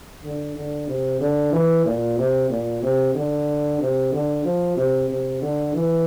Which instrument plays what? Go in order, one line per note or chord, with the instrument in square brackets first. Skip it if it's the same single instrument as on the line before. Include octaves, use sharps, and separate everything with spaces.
[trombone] D3
D3
C3
D3
E3
A#2
C3
A#2
C3
D3
C3
D3
F3
C3
C3
D3
E3